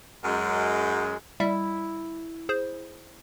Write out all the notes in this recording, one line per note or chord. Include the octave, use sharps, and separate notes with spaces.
F#2 G#3
G3 E4 E5
G#4 C5